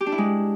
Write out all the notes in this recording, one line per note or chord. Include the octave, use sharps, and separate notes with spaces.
G4
D4
E4
G#3